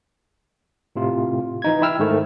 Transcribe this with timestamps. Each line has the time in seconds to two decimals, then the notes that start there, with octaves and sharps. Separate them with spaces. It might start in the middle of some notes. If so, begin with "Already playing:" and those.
0.96 A2 C3 F4
1.62 E3 D#4 G#6
1.82 E4 G5 E6 F6
1.99 G#2 D#3 A3